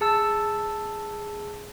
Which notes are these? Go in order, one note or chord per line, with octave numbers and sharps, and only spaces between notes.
G#4 A5 E6